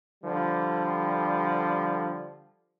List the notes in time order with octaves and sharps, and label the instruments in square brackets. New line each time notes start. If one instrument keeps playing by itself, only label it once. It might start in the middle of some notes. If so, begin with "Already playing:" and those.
[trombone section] D3 F3 G3